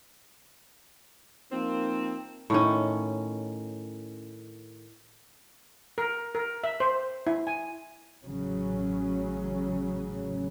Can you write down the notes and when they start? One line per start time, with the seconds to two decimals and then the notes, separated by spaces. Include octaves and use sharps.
1.52 F3 A#3 C4 D#4
2.50 A2 D#3 C#4
5.98 A#4
6.35 A#4
6.64 E5
6.80 C5
7.27 E4
7.47 G#5
8.24 A1 C#3 F#3 C#4